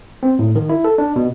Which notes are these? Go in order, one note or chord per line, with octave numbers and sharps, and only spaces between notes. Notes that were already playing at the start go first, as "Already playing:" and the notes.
C4
A2
D#3
E4
A4
D4
B2